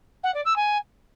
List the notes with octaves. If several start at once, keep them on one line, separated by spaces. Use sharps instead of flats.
F#5
D5
E6
G#5